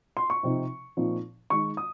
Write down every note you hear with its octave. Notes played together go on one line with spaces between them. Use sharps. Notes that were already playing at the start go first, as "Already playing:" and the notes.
C6
C#6
C3 F3 C4 D#4
A#2 F3 C4 D#4
D#3 G#3 D#4 C#6
D#6